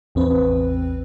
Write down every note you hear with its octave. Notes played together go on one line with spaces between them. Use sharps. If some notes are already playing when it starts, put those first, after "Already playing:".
A1 E2 C4 B4